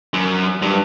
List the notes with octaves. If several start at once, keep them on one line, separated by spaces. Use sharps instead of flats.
F#2
G2